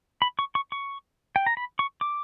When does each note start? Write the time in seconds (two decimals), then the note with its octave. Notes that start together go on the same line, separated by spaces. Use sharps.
0.22 B5
0.39 C#6
0.55 C#6
0.72 C#6
1.36 G5
1.47 A#5
1.57 B5
1.79 C#6
2.01 D6